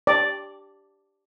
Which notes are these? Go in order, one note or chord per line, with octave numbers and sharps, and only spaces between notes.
D5